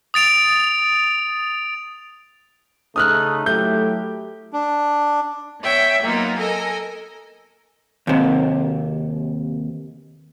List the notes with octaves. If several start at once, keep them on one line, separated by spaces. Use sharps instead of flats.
D#6 A6 D7 F7
C#3 A3 D#4 D#6 F6 F#6
F#3 A3 E4 G4 G6
D4
B3 C#5 E5 G5
F#3 A#3 B3 D#4 F4
A4 A#4 D#5 G#5
D#2 C3